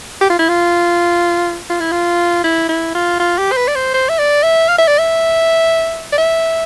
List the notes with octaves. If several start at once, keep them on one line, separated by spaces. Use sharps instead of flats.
G4
F4
E4
F4
F4
E4
F4
E4
E4
F4
F4
G4
C5
B4
D5
C5
C5
E5
D5
E5
F5
E5
D5
E5
D5
E5